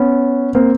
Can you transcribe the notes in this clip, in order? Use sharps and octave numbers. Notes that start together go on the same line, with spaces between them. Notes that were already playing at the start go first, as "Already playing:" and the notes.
Already playing: B3 C#4
A#3 C4